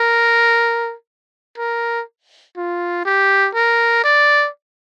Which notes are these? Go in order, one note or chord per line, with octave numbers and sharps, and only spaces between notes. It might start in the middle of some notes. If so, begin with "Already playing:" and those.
Already playing: A#4
A#4
F4
G4
A#4
D5